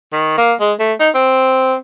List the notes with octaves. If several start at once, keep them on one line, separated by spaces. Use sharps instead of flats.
D#3
A#3
G#3
A3
D#4
C4